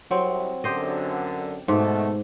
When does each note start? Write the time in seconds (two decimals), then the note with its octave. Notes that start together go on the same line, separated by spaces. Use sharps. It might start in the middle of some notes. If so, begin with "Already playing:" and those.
0.11 C2 F#3 C4
0.64 F#2 D3 G4 C5 D#5
1.68 G#2 B2 A3